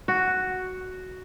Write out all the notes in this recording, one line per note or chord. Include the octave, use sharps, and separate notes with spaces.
F#4